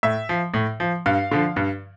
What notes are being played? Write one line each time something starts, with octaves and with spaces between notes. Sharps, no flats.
A2 E5
F3
A2
F3
G2 F5
D3 F3
G2